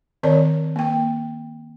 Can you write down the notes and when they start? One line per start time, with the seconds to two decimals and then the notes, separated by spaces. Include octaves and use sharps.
0.23 D#3 C4 A#4 C#5 D5 A5
0.76 A#3 G5